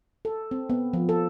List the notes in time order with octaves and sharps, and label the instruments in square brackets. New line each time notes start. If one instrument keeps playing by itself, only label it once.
[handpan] A4
C4
B3
F3
A4